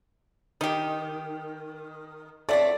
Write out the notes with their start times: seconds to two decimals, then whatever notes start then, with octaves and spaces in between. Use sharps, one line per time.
0.61 D#3 D#4 G4
2.49 F3 F#3 A3 C4 D5